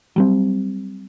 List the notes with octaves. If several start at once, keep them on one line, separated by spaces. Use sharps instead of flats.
F#3 G3 C4